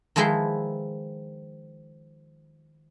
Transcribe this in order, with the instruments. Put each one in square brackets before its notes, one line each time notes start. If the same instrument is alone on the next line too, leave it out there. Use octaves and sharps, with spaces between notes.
[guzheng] D#3 F3 G#3 E4 B4 C6